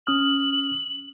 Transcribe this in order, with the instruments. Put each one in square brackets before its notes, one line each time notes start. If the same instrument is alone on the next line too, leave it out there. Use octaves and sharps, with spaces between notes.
[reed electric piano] C#4 D#6 F6 [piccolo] F#7